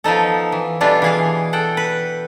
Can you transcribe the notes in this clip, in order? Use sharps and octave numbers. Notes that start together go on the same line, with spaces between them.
F3 B3 D#4 A4
E3
B2 E3 G3 D4 F4 A4
E3 G#4 F5
A4 F#5 G5
B4